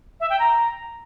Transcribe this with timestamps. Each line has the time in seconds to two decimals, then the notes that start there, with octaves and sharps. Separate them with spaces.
0.20 E5
0.30 G5
0.39 A#5